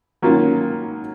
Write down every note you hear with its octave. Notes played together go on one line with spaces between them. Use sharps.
D#3 F#3 A#3 C#4 F4